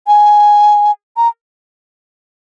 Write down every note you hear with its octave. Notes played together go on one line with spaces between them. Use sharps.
G#5
A#5